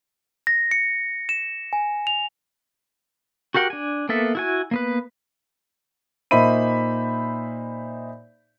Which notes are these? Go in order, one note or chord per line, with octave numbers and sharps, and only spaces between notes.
A#6
C#7
E7
G#5
F7
F#4 G4 A#4 F#5 G5
D4 G#5
A#3 B3 A4 E5
E4 F#4 G#5
A#3 B3 B4
A#2 D#4 C5 E5 B5 D#7